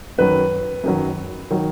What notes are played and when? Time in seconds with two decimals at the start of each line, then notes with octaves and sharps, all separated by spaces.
0.18 F#2 D#3 F#3 B4
0.83 F#2 D#3 F#3
1.51 D#3 F#3